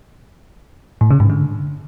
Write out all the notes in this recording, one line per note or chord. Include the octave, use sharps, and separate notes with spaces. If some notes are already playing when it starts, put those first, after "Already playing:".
A2
C#3
G#2
D3